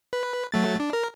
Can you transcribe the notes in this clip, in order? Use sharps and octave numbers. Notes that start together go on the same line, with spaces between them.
B4
F#3 A3 A6
D4
A#4